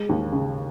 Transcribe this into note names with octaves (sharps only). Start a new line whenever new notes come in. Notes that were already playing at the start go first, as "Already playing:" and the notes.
Already playing: G#3
D#2
C#3